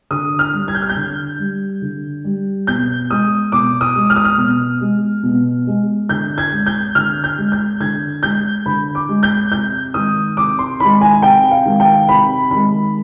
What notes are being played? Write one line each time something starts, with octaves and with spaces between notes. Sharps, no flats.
D3 D#6
F6
G3
G#6
G6
F6
G6
D3
G3
D3
G3
B2 G6
G#3 D#6
B2 D6
D#6
G#3
F6
D#6
F6
B2
G#3
B2
G#3
D3 G6
G#6
G#3
G6
D3 F6
G6
G#3
G6
D3 G#6
G#3 G6
D3 B5
D6
G#3
G6
C3 G6
D#3 G#3 D#6
C3 D6
C6
D#3 G#3 B5
G#5
C3 G5
F5
D#3 G#3
G5
C3 B5
D#3 G#3 B5